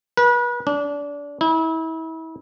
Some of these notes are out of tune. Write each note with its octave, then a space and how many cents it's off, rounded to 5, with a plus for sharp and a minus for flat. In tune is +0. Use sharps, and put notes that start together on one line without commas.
B4 -35
D4 -25
E4 -35